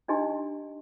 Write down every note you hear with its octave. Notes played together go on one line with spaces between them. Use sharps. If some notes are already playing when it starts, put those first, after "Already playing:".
D4 D#4 G4 D#5 G#5 C6